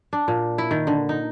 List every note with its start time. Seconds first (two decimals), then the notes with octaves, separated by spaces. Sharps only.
0.13 D4
0.28 A#2
0.58 E4
0.71 D#3
0.87 D3
1.09 D#4